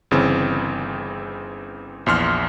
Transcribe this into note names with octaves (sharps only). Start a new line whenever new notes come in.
G1 C#3 E3 C4
A#1 E2 C6 F6